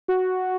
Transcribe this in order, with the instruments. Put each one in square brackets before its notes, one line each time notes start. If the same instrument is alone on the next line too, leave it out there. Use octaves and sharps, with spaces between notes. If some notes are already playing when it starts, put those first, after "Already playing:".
[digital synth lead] F#4